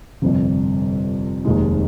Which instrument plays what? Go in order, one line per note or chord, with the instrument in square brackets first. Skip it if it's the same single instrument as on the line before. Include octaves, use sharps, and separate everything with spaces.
[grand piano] G1 F2 C3
F1 D#2 D#3 G#3